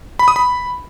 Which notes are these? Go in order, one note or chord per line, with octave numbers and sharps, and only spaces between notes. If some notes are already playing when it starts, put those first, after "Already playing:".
B5
D#6
B5